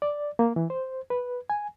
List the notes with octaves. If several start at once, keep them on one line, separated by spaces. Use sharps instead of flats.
D5
A#3
E3
C5
B4
G#5